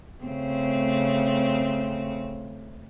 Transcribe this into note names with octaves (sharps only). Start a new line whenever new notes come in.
C#3 A3 C4